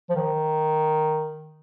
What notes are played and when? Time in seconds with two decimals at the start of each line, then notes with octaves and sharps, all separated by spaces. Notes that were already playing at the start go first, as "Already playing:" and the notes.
0.10 F3
0.16 D#3